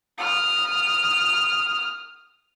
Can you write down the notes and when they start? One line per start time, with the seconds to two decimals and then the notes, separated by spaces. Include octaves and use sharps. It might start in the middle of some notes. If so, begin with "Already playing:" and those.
0.18 D#6 F6